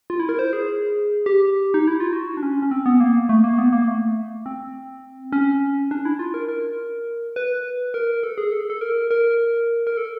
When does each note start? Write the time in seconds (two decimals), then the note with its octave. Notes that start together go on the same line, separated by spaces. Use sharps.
0.10 F4
0.19 E4
0.29 A#4
0.39 C5
0.53 G#4
1.26 G4
1.74 D#4
1.87 E4
2.00 F4
2.13 F#4
2.37 D4
2.43 C#4
2.62 C#4
2.71 C4
2.86 B3
3.00 A#3
3.29 A3
3.44 A#3
3.58 B3
3.73 A#3
3.88 A3
4.46 C4
5.32 C#4
5.91 D4
6.05 E4
6.19 F4
6.34 A#4
6.48 A#4
7.36 B4
7.94 A#4
8.23 A4
8.38 G#4
8.52 A4
8.70 A4
8.81 A#4
9.11 A#4
9.87 A#4
9.97 A4